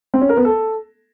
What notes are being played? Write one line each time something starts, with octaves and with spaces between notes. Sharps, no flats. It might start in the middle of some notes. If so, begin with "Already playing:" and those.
C4
C#4
A#4
B3
A4